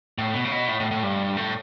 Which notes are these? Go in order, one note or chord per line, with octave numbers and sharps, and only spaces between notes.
A2
B2
C#3
B2
A2
A2
A2
G2
A2